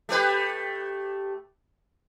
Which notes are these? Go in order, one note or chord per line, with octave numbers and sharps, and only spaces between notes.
A3 G4 B4